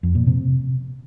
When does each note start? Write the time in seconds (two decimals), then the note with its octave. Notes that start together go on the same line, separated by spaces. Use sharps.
0.03 F2
0.15 A#2
0.27 C3